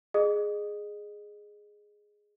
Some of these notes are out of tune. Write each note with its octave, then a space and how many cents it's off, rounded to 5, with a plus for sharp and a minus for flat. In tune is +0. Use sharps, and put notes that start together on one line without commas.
G#4 +0 D#5 -30 D#6 +0